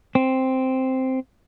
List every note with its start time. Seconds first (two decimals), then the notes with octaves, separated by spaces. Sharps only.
0.15 C4